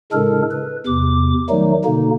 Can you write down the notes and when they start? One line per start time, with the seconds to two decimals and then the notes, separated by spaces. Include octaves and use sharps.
0.13 A2 C#3 G#3 D4 A4 A#4
0.51 B4
0.87 E2 C3 D6
1.49 D#3 F#3 G3 A3 D#4
1.85 B2 D3 A#3 D#4